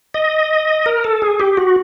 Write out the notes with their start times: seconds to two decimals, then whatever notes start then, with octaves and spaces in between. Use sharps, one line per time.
0.14 D#5
0.86 A#4
1.04 A4
1.22 G#4
1.40 G4
1.57 F#4